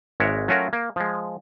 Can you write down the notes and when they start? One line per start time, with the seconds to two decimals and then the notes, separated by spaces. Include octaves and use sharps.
0.20 G#1 G#3 A#4 C#5 E5 F#5
0.48 F#3 A3 C#4 F4 F#4 A#4
0.73 A#3
0.96 F3 G#3